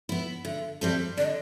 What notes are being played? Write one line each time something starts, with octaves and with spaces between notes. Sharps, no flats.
B3 E4
D3 E5
G3 C4 E4 A4
D3 D5
D#5